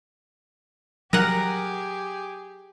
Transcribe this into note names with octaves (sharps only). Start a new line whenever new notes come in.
F#3 G4 G#4 A#4 F#5